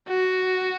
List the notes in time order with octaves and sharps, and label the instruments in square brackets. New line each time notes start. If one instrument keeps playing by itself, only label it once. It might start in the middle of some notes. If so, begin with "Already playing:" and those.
[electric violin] F#4